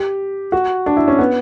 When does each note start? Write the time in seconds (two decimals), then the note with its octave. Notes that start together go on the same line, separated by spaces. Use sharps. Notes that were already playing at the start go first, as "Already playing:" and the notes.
Already playing: G4
0.52 F#4
0.86 D4
0.97 E4
1.08 C#4
1.19 B3